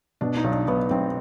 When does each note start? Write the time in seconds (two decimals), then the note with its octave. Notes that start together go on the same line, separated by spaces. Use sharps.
0.21 B2 D4
0.37 D#4
0.44 B1
0.52 D4
0.67 B1 B3
0.90 B1 C4